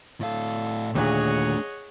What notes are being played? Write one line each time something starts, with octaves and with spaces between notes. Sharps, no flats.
A2 A4 F5
D#2 A#2 A3 D4 G#4 C#5 D#5 F#5